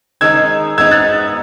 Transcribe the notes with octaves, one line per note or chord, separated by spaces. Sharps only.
D#3 G#3 D#4 E6 G#6
G#3 B3 D#4 E6 G#6
F#6 A6